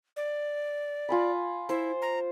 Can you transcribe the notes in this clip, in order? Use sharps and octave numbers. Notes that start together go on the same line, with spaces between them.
D5
F4 G#5 B5
E4 C5
A#5